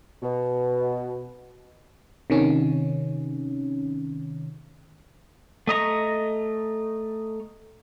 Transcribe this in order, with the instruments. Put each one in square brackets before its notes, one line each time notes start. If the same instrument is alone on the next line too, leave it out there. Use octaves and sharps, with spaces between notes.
[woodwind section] B2
[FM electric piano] C3 D#3 C#4
[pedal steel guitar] A3 D#5 A#5 C#6